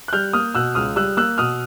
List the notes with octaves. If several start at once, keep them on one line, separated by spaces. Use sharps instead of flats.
F#6
G3 F6 G6
A#3 D#6 F6
B2 E6 F#6
C#2 D#6 F6
G3 E6 F#6
A#3 E6 F#6
B2 D#6 F6